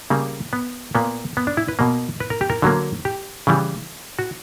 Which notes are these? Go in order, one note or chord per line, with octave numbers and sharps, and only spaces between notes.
C#3 G3 A#3
B3
A#2 A#3 B3
B3
D4
E4
B4
B2 A#3
B4
A#4
G4
A#4
D3 F#3 A#3
G4
C#3 E3 G3
F#4